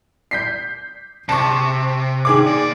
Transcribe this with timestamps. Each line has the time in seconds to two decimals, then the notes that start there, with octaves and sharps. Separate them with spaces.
0.31 G6 B6 C7
1.29 C3 A5 C#6
2.25 D#3 G#4 D6
2.47 A#2 D5